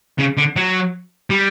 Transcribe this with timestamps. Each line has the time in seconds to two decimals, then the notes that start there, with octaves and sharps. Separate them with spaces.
0.19 C#3
0.37 D3
0.56 F#3
1.30 G3